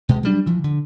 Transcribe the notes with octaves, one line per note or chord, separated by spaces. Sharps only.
B2 G#3
F#3 G3 D4
E3 F3
D3